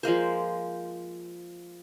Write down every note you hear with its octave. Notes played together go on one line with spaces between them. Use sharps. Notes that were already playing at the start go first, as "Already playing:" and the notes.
F3 G#3 A#3 C5